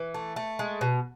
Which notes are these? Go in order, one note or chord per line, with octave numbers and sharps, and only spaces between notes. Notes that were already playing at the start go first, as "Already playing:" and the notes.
Already playing: E3
A3
A3
G#3
B2